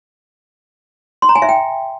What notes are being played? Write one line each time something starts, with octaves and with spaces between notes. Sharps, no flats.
C6
A#5
G#5
E5
G5